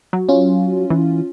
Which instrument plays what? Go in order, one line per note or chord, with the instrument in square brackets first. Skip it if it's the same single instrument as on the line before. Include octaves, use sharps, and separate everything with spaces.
[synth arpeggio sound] F#3
[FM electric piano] C#4 F4
[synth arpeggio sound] E3